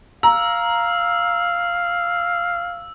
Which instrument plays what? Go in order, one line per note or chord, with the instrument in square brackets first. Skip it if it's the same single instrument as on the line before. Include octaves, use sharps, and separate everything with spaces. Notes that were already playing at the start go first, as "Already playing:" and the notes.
[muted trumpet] F5 [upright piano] A#5 [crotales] E6